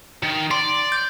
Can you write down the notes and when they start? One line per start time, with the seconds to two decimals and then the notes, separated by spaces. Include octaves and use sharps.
0.23 D#3
0.51 D5 C6
0.92 G6